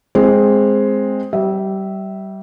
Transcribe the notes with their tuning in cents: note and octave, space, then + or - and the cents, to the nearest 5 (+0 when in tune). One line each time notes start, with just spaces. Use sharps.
G#3 +0 C4 +5
G3 -25 E5 -10